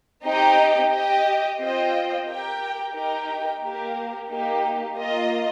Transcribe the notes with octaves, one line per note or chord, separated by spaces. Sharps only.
C4 D#4 G4 D#5 G5
G4 D#5 G5
C4 F4 C5 D#5 G5
G4 A#4 G5
D#4 G4 A#4 G5
A#3 G4 A#4
A#3 D#4 G4
A#3 F4 D#5